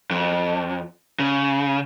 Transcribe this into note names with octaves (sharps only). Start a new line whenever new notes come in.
F2
C#3